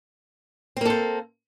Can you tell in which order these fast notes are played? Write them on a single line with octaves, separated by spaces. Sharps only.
C4 A#3 A4 C5